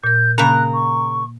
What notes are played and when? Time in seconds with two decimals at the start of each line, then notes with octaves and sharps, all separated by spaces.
0.04 A#2 A#4 G6
0.38 C#3 A#3 A#4 A#5 F#6
0.74 C#6